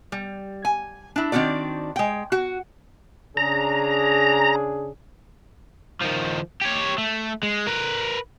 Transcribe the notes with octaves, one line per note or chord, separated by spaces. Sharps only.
G3
G#5
D4 E4
D#3 C4 D4 F#4 D5
G#3 G5
F#4
C#3 D4 G#4 A#5
D#3 F3
G4 C#5
A3
G#3
A#4 B4